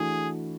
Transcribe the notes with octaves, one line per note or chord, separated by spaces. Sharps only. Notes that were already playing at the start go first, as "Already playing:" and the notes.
Already playing: E3 A3 D4 F#4 G#4